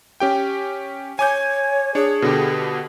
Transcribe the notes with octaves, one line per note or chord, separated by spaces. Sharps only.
C#4 G4 G5
C#5 G#5 D6 G6
D4 G#4 C#5
B2 D3 G4